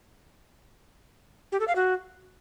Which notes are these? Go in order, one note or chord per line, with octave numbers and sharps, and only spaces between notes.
G4
A4
F5
F#4